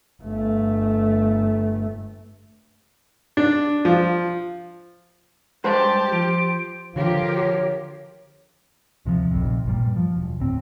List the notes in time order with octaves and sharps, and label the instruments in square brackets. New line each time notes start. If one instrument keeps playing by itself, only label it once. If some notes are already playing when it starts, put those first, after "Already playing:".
[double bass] G1 A3
[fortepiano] D4
F3
[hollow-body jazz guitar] G2 G#3 [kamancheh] G4 [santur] C5 [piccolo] A5
[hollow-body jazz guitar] F3 [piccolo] D7
[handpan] D3 [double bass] F3 [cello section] F4 G4 A#4 [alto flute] C#5
[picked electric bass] D2 C3 E3 F3
F1 A#1 F2 C3
G2 A#2 G3
F3
E1
D2 A2 C4